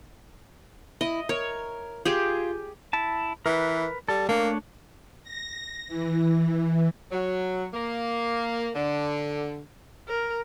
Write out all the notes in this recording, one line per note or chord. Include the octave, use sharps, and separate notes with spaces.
E4 D#5
A#4 C#5
F4 G4 G#4
E4 A5
E3 A#4 B4
G3 A4
A3 A#3 D4 C#5
A#6
E3
F#3
A#3
D3
A#4